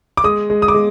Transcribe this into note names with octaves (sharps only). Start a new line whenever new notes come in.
D6
G#3 D#6
G#3
D#6
D6
G#3